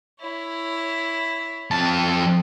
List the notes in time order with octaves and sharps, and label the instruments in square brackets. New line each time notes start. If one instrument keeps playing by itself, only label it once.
[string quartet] E4 C#5
[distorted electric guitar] F2 A5